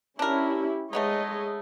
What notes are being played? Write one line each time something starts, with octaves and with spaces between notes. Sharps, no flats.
C#4 D4 E4 G4 A#4
G#3 A3 B3 D#4 C#5 D#5